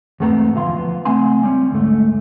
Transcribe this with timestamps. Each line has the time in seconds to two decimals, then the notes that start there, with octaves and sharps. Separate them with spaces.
0.20 E2 G#2 A3 B3 C4 A#5
0.53 D2 B2 E3 F3 F5 C6
0.77 F3 B3
1.05 C#2 A3 C4 F#5 G#5 C6
1.43 G3 C4 C#4
1.71 D2 G#2 A3